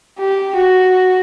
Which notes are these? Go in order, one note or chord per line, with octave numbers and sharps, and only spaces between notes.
G4
F#4